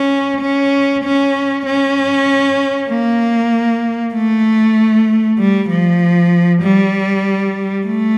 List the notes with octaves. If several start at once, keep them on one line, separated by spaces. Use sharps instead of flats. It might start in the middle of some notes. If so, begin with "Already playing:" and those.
Already playing: C#4
C#4
C#4
C#4
A#3
A3
G3
F3
G3
A3